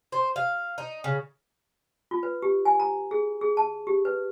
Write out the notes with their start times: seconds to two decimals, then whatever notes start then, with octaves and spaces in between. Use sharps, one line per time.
0.12 C5
0.36 F5
0.78 D#4
1.04 C#3
2.11 F4
2.23 B4
2.42 G4
2.65 G#5
2.80 A#5
3.11 G#4
3.41 G#4
3.57 A5
3.87 G4
4.05 B4